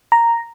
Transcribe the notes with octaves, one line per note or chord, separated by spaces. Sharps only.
A#5